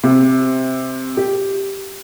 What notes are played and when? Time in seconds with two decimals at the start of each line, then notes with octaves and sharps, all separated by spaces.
0.03 C3
1.17 G4